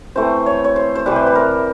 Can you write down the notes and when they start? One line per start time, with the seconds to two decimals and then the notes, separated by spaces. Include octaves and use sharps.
0.15 E3 A3 C4 C5
0.46 C#5
0.64 C#5
0.76 C5
0.95 C5
1.06 C3 E3 G3 B4
1.16 C5
1.27 B4
1.35 A#4